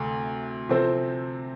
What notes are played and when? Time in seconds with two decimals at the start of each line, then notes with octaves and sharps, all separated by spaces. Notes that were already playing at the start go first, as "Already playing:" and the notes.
Already playing: D2 C3 A3
0.69 C3 F3 C4 A4 C5